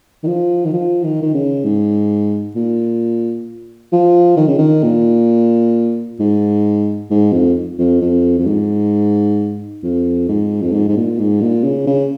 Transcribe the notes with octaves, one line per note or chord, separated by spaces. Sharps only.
D#3
F3
D#3
F3
D#3
D#3
C#3
G#2
A#2
F3
D#3
C#3
D#3
A#2
G#2
G#2
F2
F2
F2
F2
G#2
F2
G#2
F2
G#2
G#2
A#2
G#2
A#2
C#3
C#3